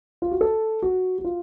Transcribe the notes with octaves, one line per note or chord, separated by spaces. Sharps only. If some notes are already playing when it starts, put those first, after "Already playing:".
F4
F#4
A4
F#4
F#4
F4